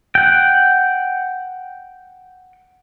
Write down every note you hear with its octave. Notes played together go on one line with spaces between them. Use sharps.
F#5 G5